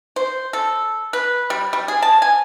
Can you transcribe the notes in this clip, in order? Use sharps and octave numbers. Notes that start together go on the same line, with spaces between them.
C5
A4
B4
G3
G3
G#4
A5
G#5